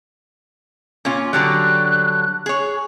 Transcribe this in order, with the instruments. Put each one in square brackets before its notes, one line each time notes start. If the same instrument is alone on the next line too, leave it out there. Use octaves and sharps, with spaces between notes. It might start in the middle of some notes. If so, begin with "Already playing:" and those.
[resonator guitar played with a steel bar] A#2 C#4 F4
[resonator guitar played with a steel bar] D3 F#3 G3 [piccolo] F#6
[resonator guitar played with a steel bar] G#4 C#5